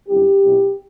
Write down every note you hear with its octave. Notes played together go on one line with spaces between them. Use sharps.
F#2 D3 G3 C4 E4 G4
B2 F#3 C4 E4